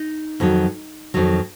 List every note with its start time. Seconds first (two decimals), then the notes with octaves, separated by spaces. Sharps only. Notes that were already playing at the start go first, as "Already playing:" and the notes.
Already playing: D#4
0.40 F2 D#3 F#3
1.14 F2 D#3 F#3